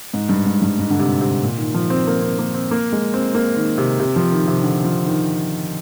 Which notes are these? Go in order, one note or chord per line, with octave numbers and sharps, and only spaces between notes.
G#2
G2
G#2
G2
G#2
D3
C3
C3
A#2
D#3
F3
C4
A#3
C4
A#3
C4
A#3
G#3
C4
A#3
D#3
C3
C3
F3
D#3
C3
D3
F3
D#3